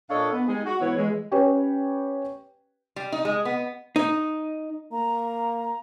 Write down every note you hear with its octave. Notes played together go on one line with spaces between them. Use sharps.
A#2 D4 A4 C#5 D#5 F5
B3
G3 G#3 D#4 G#4
F#4
G#2 E3 B3 E4 C#5
E3 G#3
C#4 G4 B4 C#5 G5
G3
D#4
G#3
B3
D#4
A#3 A#5